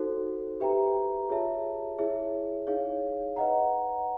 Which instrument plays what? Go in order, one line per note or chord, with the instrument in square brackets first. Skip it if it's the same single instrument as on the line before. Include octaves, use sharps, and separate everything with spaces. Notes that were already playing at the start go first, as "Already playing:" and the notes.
Already playing: [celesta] D#4 F#4 A4 C5
G4 B4 E5 G5 A#5
F4 G#4 C#5 E5 A5
E4 G#4 C#5 E5
D#4 G#4 C#5 F5
B4 D#5 F#5 A#5